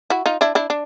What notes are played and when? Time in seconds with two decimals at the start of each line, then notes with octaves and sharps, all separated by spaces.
0.10 E4 F#4
0.26 D#4 F4
0.41 D4 E4
0.55 D4 E4
0.70 D4